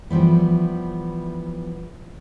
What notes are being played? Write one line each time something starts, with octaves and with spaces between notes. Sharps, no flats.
E3 F3 G3 B3